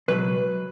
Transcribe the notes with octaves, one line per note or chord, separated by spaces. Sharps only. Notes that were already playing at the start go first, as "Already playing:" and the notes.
C#2 B2 F#3 B4